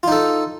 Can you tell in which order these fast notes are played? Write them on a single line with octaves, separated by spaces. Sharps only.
F4 D#4 A4